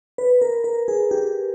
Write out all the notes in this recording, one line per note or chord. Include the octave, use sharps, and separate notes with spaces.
B4
A#4
A#4
G#4
G4